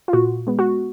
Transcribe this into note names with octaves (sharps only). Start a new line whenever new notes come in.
F4
A#2 F#4
G#3 B3
F#4